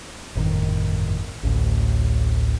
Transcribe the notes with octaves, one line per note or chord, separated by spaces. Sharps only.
G1 F2 A2 D#3
A1 D2 A2